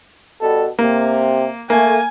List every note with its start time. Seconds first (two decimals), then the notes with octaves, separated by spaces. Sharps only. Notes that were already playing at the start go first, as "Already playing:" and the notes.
0.40 B2 G3 A4
0.79 C3 A#3
1.70 A3 A#3 G#5